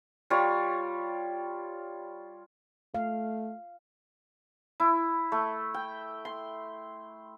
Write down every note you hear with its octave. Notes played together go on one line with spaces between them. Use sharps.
G3 F4 C#5
A3 F5
E4
A3
G5
C6